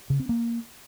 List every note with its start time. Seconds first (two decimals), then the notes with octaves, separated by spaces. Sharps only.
0.10 C#3
0.20 C4
0.29 A#3